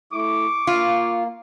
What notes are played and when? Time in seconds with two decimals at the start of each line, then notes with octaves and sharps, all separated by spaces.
0.13 A3 E4 C#6 D6
0.67 A#3 F4